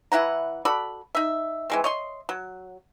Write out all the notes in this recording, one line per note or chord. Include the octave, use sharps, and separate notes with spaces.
E3 E4 F#5 A#5
F#4 A4 D5 B5
D#4 E5
E3 G#3 C4
C#5 D#5 C6
F#3